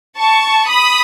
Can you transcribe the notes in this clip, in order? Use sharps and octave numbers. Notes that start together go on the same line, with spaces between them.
A5 C#6
B5 D#6